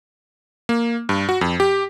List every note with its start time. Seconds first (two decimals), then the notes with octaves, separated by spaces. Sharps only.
0.69 A#3
1.09 G2
1.29 F#4
1.41 F2
1.60 G4